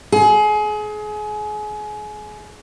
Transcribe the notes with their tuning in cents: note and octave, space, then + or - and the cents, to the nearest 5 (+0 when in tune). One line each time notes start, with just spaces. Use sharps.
G#4 +30